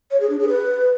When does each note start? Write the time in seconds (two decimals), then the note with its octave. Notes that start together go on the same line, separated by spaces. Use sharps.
0.11 C#5
0.20 G#4
0.30 D4
0.39 G#4
0.48 B4